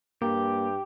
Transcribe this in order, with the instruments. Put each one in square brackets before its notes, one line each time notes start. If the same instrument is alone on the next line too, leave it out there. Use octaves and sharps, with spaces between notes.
[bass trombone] G2 [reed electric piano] A#3 [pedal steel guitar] G4